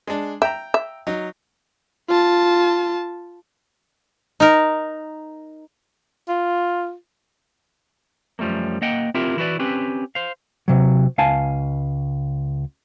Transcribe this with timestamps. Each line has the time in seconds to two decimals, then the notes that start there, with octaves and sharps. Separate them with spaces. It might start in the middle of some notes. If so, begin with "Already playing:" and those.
0.07 G#3 D4
0.42 E5 G5 A#5
0.74 E5
1.07 F#3 D#4
2.09 F4 A5
4.40 D#4 A#4
6.29 F4
8.39 F#2 F3 G3 A3 A#3
8.82 A#3 D#5 F#5 G5
9.14 C4 E4 F4 G4 A#4 E5
9.37 E3 E4 F#4 B4 D5
9.59 C4 C#4 G4 B4
10.15 C5 F5
10.68 C3 F#3
11.18 C#2 F5 G#5 A5